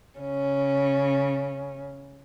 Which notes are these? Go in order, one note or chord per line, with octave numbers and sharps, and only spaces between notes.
C#3 C#4